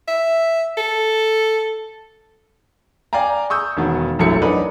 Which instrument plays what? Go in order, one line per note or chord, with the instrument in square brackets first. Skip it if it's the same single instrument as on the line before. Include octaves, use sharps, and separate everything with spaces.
[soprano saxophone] E5
A4
[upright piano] D5 F5 G5 G#5 A#5
C#6 D#6 E6 G6
E1 D#3 B3
E1 A#1 F#2 A3 E4 C#7
F#3 D4 D#4 A#4 B4